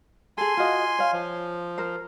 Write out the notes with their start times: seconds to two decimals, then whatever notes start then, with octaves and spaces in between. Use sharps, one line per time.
0.38 G#4 A4 G#5 C6
0.57 F4 F#4 D#5
0.99 C#5 F5
1.13 F3
1.78 A#4 C5